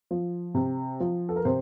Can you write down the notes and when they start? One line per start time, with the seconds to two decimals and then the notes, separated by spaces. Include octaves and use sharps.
0.11 F3
0.54 C3
1.00 F3
1.29 A4
1.36 A#4
1.45 C3 C5